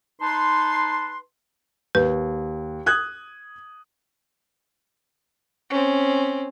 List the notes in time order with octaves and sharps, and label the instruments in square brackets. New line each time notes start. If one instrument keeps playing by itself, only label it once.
[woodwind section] D#4 B4 A5 C6
[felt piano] D#2 [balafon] B4
[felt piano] D#6 F#6 G#6
[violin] C4 C#4